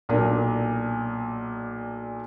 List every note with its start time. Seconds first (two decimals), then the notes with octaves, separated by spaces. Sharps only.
0.09 B1 A#2 D4 A#4